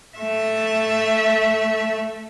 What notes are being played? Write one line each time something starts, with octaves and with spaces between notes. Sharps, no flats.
A3 E5